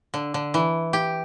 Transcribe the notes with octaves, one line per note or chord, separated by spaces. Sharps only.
D3
D3
E3
G4